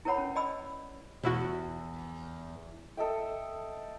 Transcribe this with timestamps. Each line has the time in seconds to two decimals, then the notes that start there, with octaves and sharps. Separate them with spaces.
0.05 E4 A#4 B4 C#5 F#5 B5
0.18 C#4
0.36 D5 D#5 B5 E6
1.23 E2 B2 E4 F#4
2.97 A4 D#5 E5 G5